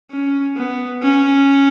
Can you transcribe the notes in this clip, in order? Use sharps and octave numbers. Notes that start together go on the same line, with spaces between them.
C#4
B3
C#4